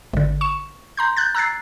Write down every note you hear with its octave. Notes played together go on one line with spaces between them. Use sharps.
G#1 D3
C#6 E7
A#5 C6 G6
F#6 G6 A6
A#5 E6 F#6 G#6 A6 C7